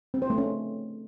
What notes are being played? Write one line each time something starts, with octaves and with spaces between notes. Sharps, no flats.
C4
C5
A3
C#4